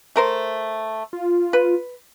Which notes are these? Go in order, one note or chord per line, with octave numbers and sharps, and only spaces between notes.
A3 A#4 C5
F4
B4